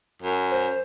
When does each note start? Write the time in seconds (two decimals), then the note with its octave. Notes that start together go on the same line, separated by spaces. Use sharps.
0.22 F#2
0.51 C5